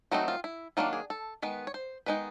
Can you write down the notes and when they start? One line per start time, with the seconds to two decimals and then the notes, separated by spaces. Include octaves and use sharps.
0.12 D#3 F#3 A3 C4 D#4 F#4
0.28 F4
0.44 E4
0.77 D#3 F#3 A#3 D4 F4
0.93 G#4
1.10 A4
1.42 D#3 G#3 B3 B4
1.67 C#5
1.74 C5
2.06 D#3 G#3 B3 D#4 B4